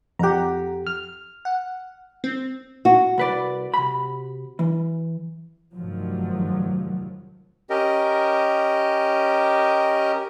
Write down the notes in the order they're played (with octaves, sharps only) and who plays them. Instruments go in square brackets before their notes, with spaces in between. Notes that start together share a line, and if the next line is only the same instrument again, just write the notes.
[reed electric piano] F2 G4 [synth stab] F#5 A#5
[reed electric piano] F6
[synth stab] F#5
C4
[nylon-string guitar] F#4
[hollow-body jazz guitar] C2 B4 D5
C3 B5
E3
[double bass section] F1 G2 D#3 F3 F#3
[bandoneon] C#4 G4 A#4 D#5